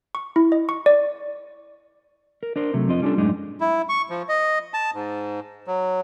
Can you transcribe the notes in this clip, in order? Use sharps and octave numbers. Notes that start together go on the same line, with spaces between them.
C#6
E4
D#5
C#6
D5
A#4
D4 A#4 C5
C3 F#3 A3
F2 C4 F4 D#5
G3 C#4 D4 F4 A4
F#2 A2 G#3 D4 D#4
E4
C#6
F3
D#5
A5
G#2
F#3